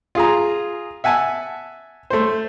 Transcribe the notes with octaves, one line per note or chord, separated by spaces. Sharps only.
F4 G#4 A#5
E5 F#5 G#5 A5
A3 C5